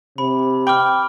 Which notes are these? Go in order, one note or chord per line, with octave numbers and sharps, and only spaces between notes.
C3 B5
G5 B5 D6 F6